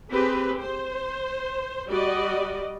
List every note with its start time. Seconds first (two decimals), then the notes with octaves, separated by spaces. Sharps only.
0.12 C4 G4 G#4 B4
0.62 C5
1.88 G3 F#4 D5 D#5